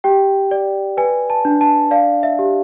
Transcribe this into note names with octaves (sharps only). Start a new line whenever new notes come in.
G4 G5
D5
B4 G#5
A5
D4
A5
D5 F5
E5
G4